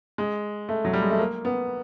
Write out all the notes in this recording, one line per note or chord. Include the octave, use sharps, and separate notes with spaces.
G#3
A3
F#3
G3
G#3
A3
A#3
B3